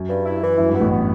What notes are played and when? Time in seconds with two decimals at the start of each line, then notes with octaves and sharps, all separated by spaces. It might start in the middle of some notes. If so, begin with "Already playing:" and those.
Already playing: F#2
0.09 G2
0.26 E4
0.42 E3
0.59 F#2 E4
0.69 G2
0.75 B3
0.80 A1 A2
0.91 B3